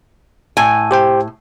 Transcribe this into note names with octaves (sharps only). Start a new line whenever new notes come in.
A2 G#5
G4 C5 G5